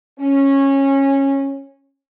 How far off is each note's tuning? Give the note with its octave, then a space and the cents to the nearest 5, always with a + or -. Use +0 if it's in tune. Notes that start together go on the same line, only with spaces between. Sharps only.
C#4 -15